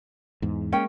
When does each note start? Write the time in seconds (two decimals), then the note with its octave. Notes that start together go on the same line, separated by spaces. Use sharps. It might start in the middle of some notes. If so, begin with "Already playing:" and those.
0.42 E2 G#2
0.72 G#3 A#3 C#4 G5